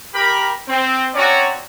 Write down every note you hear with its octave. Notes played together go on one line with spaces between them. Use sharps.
G4 A#4 B5
C4
C4 C#4 F#4 C#5 D5 A#5